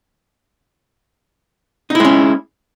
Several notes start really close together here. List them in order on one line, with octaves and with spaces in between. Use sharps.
D#4 E4 G#3 C#4